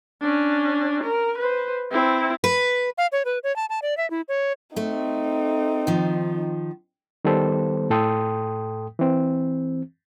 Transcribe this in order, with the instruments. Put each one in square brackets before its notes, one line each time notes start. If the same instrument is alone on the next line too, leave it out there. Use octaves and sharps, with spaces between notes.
[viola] C#4 D4
A#4
B4 C5
C4 E4
[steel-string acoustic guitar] B4
[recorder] F5
C#5
B4
C#5
A5
A5
D5
E5
E4
C#5
[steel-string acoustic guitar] A3 [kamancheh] C4 D#4
[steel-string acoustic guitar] D#3 F3
[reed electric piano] D#3 G3 B3 A4 C5
A2 A4 G5 C6 D#6
E3 C4